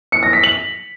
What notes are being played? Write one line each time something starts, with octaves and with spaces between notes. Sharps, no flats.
C#7
A#6
B6
F#7